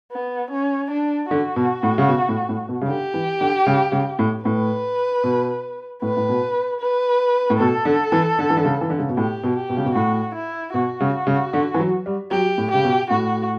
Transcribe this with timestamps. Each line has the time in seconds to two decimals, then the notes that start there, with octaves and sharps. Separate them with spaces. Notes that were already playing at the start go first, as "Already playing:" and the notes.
0.12 B3
0.51 C#4
0.91 D4
1.30 D3 F#4
1.56 B2
1.83 A2
1.98 C#3
2.08 B2
2.28 A2
2.49 A2
2.68 B2
2.81 C#3
2.87 D3 G4
3.14 E3
3.41 D3
3.67 C#3
3.92 C#3
4.19 A2
4.45 A2 B4
5.24 B2
6.02 A2 B4
6.16 A2
6.29 B2
6.81 B4
7.50 A2
7.59 B2 A4
7.85 D3
8.12 E3
8.39 D3
8.50 E3
8.57 D3
8.65 C#3
8.81 E3
8.90 D3
8.99 C#3
9.09 B2
9.16 A2 G4
9.43 B2
9.56 G4
9.69 B2
9.77 C#3
9.85 B2
9.95 A2 F#4
10.35 E4
10.74 B2 F#4
11.00 C#3
11.27 C#3
11.53 D3
11.74 E3
11.79 F#3
12.06 G3
12.31 F#3 G4
12.58 A2
12.71 C#3 G4
12.84 B2
13.10 A2 F#4